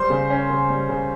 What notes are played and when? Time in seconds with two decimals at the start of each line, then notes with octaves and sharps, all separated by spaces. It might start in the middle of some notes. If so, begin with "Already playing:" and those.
Already playing: G3 C5 C6
0.10 C#3
0.30 C#4
0.50 C#3
0.70 G3
0.89 C#3